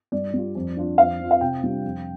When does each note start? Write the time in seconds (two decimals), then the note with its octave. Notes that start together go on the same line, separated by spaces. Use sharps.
0.12 G2 D5
0.34 G3 F4
0.55 F2
0.77 F3 D4 F4
0.98 F2 F5
1.20 F3 C4 F4
1.31 F5
1.41 C3 G5
1.63 G3 D4 F4
1.84 F2